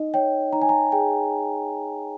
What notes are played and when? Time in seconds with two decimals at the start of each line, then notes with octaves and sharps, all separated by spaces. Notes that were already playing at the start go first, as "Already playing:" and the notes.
Already playing: D#4 D#5
0.14 C#5 G5
0.53 D#4 A#5
0.62 G#5
0.69 A#5
0.92 G#4 G5